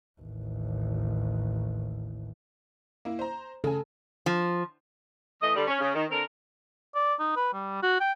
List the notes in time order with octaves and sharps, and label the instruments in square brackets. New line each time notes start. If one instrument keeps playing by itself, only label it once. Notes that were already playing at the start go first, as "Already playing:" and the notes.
[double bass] A1 D#2
[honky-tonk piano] A#3 E4
C5 A#5
[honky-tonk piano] C#3 G#5 [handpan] A4
[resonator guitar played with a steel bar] F3
[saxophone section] E3 A3 D#5
D3 G3
C#4
C#3
D#3
D3 C4 A#4
[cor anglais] D5
D#4
B4
G3
F#4
G5